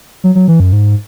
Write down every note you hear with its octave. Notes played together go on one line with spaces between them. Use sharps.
F#3
F#3
E3
F#2
G#2